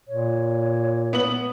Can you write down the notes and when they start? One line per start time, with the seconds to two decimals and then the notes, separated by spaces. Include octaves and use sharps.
0.08 A#2 C#5
1.13 B3 F#7